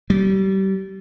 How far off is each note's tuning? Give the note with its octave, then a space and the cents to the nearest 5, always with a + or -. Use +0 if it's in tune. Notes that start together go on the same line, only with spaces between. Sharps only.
G3 -30